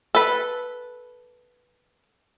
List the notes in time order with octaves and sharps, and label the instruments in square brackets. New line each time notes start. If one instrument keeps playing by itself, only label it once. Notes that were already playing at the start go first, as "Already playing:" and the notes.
[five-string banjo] A4 B4